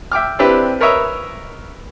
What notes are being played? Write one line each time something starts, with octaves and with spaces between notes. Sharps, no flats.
E5 G5 D6 F6
C4 D4 E4 G4 B4
A#4 B4 C#5 D#5 E5